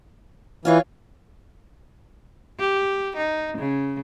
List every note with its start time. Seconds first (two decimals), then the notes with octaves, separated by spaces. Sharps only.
0.65 E3 F4 C#5 F5
2.59 G4
3.17 D#4
3.58 C#3